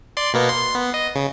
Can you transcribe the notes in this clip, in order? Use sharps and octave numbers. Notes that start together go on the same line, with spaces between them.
D5 C6
B2 A#3 B3
C6
B3
D#5
C#3